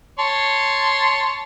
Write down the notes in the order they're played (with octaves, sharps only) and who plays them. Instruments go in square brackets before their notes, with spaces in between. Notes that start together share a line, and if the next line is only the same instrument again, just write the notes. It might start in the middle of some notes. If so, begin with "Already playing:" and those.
[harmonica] C#5 A5 C6